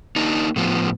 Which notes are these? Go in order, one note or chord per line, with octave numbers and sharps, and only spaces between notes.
A#3 D4 D#4
A2 F3 B3